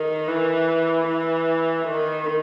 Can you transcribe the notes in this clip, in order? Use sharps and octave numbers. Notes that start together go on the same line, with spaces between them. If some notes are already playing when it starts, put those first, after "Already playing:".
Already playing: D#3
E3
E3
D#3